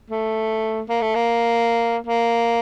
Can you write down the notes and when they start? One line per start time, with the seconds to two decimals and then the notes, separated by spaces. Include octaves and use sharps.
0.10 A3
0.89 A#3
1.02 A3
1.15 A#3
2.07 A#3